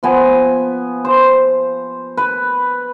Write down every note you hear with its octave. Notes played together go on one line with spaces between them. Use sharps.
F3 B3 G#5
C5
B4